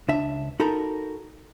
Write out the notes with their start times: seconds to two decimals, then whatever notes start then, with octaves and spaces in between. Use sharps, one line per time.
0.08 C#2 D4 E5
0.60 D#4 F#4 A4 A#4 A#5 B5